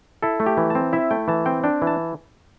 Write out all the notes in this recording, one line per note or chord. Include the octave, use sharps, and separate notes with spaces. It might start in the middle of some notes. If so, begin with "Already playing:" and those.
E4 A4
A3
G4
E3
C4 A5
E4 E5
A3 G5
E3 A5
C4 G5
D4 G5
E3
A5